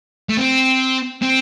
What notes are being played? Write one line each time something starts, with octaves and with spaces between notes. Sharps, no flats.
A3
C4
C4